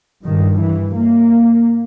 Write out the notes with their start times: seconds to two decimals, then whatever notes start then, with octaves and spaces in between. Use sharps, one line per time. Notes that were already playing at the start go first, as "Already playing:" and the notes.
0.25 G2 D#3
0.60 E3
0.95 A#3